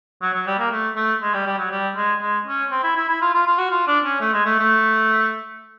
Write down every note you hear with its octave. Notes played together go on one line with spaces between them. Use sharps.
F#3
F#3
G3
A#3
A3
A3
G#3
G3
G3
F#3
G3
G#3
G#3
C#4
C4
E4
E4
E4
F4
F4
F4
F#4
F4
D4
C#4
A3
G#3
A3
A3